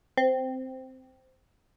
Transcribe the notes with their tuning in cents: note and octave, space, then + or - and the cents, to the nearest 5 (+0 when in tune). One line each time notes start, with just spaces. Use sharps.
C4 -10